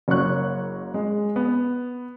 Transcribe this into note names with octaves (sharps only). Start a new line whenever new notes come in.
F#1 F#3 A#3 C#5 C#6 F#6
G#3
B3